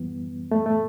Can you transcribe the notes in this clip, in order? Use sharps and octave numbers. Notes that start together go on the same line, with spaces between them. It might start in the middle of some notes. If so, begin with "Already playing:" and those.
Already playing: F#2 E3 G3 B3
A3
A3